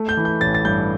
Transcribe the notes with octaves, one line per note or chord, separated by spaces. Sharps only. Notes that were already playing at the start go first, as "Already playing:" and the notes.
Already playing: A3
G6
E3
G6
A1 A6
A6
G2 G6